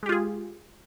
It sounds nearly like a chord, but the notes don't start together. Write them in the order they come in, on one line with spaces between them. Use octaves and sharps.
G#3 G4 F4 G#4